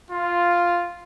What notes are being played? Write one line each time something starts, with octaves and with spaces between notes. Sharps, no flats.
F4